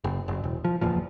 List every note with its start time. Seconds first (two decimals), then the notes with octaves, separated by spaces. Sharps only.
0.04 F#1
0.28 F#1
0.44 E1
0.65 F3
0.81 F#1 E2 A#2 F3